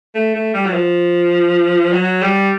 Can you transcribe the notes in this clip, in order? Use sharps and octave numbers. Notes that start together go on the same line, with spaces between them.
A3
A3
G3
F#3
F3
F#3
G3